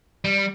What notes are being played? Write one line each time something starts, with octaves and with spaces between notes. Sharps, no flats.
G3